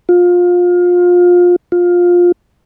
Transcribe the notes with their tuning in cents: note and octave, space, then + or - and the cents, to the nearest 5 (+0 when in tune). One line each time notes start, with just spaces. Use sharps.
F4 +25
F4 +15